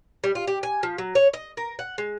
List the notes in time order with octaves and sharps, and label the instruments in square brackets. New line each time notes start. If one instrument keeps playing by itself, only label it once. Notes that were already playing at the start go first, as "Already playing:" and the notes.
[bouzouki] G3
F4
G4
G#5
F3
F#3
C#5
D#5
A#4
F#5
G#3